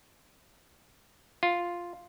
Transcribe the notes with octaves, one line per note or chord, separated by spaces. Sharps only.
F4